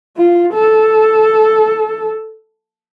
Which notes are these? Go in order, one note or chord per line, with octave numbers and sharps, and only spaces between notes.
F4
A4